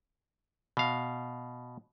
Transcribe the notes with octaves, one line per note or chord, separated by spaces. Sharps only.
B2 F5